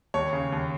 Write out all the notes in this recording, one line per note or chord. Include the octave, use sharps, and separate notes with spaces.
D#2 C#5
C#3
D#2